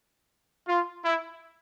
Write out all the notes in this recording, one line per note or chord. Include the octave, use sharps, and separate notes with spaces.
F4
E4